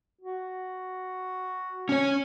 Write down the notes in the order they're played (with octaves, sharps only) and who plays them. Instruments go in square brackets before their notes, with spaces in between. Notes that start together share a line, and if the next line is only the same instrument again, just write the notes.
[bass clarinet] F#4
[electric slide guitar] C#4 C#5